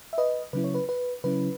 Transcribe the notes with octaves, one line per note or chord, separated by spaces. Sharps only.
E5
B4 D#5
C#3 F#3 C#4 E4 B4
C#5
B4
B4
C#3 F#3 C#4 E4 B4